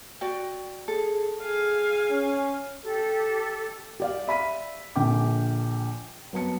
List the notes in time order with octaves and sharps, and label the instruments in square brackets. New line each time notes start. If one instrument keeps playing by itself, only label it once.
[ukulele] F#4 D5 G5
[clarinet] G#4 [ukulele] A4
[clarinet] G#4 [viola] F5 G#5
[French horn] C#4
[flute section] G4 A4
[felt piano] G4 D5 F5
E5 B5 B6 D#7
A#1 D3 G5 D6
F#3 B3 A5 C#7